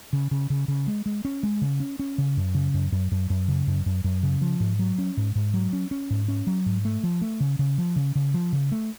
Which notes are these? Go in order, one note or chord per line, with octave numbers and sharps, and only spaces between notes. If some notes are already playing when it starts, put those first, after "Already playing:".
C#3
C#3
C#3
C#3
G#3
G#3
C#4
G#3
C#3
C#4
C#4
C#3
F#2
C#3
F#2
F#2
F#2
F#2
C#3
F#2
F#2
F#2
C#3
F3
G#2
F#3
C#4
G#2
G#2
F#3
C#4
C#4
G#2
C#4
F#3
G#2
A3
F3
A3
C#3
C#3
F3
C#3
C#3
F3
C#3
A3